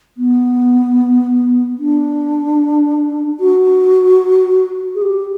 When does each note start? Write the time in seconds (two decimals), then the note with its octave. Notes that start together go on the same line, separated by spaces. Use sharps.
0.17 B3
1.79 D4
3.40 F#4
4.95 G#4
5.02 G4